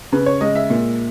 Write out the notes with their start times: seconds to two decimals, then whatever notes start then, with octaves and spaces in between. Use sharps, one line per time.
0.12 C#3 B4
0.26 C#5
0.41 G#3 D#5
0.56 E5
0.70 A#2